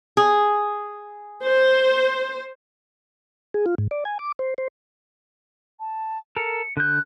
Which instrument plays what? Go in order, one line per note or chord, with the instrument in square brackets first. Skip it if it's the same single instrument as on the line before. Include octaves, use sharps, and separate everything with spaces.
[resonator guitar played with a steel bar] G#4
[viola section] C5
[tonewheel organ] G#4
F4
G#2
D5
G#5
D6
C5
C5
[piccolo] A5
[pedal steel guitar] A4 A#4 [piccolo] C#7
[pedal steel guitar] D3 G6 [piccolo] F#6